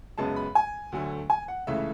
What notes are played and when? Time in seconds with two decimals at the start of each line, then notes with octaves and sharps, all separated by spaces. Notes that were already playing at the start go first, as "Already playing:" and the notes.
0.18 F#2 C#3 G#3 B3 A5
0.36 B5
0.55 G#5
0.92 D2 D3 F#3 A3
1.30 G#5
1.48 F#5
1.67 C#2 C#3 E3 A3 E5